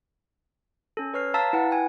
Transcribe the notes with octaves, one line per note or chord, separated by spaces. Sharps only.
C#4 A4
B4 C#5 F6 C7
F5 A5 A#5 E6 A6 B6
E4 B4 F#5
G5 G#5